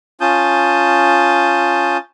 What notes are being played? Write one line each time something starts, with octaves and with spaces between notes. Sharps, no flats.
C#4 F4 A5 D#6 G6